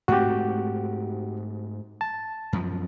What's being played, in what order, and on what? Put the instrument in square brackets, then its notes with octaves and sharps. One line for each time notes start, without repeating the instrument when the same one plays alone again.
[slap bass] G#2 A3 C4 [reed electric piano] F#4 G4
[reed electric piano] A5
[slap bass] F#2 F3